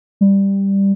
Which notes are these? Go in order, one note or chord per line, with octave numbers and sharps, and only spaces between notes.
G3